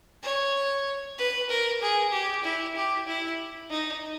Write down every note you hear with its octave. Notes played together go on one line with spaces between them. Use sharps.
C#5
B4
A#4
G#4
G4
E4
G4
E4
D#4